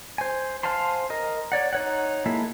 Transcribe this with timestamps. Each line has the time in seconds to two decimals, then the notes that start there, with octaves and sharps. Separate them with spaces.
0.18 C5 G#5
0.63 C5 F5 G#5 A5 C6
1.10 A#4 D#5
1.52 C#5 D5 F#5
1.73 D#4 C#5 F#5
2.26 G#3 A#3 E4 A4 E5